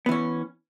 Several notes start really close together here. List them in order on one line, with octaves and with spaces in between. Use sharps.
B3 E3 C#4